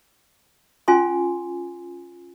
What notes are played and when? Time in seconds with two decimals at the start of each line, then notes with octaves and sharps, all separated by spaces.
0.88 C#4 F4 G#5 C6